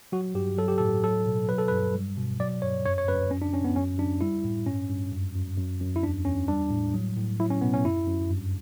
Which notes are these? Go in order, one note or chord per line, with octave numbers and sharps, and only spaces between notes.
F#3 F#4
G2 G4
F#3 A4
G4
A2 A4
F#3 A4
B2
F#3 B4
A4
B4
G2
G3
B2
F#3 D5
G2 C#5
F#2 C#5
C#5
F#2 B4
F#2 C#4
D4
F#2 C#4
B3
F#2 C#4
F#2 D4
G3 E4
A2
G2 C#4
G2
F#2
F#2
F#2
F#2
E4
E2 D4
E2 C#4
G3 D4
A2
F#3
A2
F#3 E4
C#4
B2 B3
C#4
F#2 E4
F#2
G2